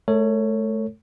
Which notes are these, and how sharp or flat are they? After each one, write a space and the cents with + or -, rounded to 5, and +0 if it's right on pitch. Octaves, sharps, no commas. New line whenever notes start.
A3 -30 A4 +45 C#5 +0